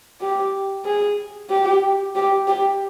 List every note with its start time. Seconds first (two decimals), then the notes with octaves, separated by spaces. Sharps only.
0.21 G4
0.86 G#4
1.50 G4
2.15 G4
2.48 G4